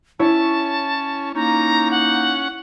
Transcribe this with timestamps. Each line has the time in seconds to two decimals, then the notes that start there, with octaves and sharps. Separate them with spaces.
0.19 C#4 E4 C#5 A5
1.35 A#3 C#4 D#4 A#5
1.91 F#5